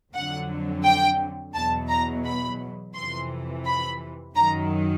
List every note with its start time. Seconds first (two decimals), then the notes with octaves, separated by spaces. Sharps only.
0.13 F2 D3 F#3 F#5
0.84 G5
1.55 E2 B2 F#3 A5
1.89 A#5
2.25 B5
2.95 F2 C3 E3 C6
3.65 B5
4.36 F#2 D#3 F#3 A#5